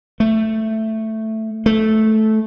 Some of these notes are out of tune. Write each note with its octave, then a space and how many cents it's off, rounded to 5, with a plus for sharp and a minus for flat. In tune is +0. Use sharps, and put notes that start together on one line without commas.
A3 +5
A3 -10